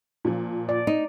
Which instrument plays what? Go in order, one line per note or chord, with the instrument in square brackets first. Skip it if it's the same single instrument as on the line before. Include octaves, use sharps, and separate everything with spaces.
[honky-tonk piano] A#2 F3
[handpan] D5
[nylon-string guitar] D#4